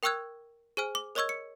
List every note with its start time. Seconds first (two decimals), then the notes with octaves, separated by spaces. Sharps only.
0.03 A#4 G5 C#6 E6 F#6 G#6
0.77 G#4 C5 G#5 F6
0.95 D6
1.15 A#4 C#5 D#5 C#6 E6 G#6
1.29 C#7